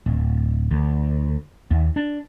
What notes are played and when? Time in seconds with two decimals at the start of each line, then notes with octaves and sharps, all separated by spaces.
0.06 D1
0.71 D2
1.71 D#2
1.96 D4